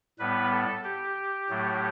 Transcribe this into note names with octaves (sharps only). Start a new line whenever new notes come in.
A2 G3 B3 B4
A4
G4
A2 F#3 A3